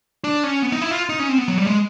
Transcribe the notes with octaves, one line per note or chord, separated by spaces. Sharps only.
D4
C#4
B3
D#4
E4
F4
D#4
C#4
C4
B3
F#3
G3
G#3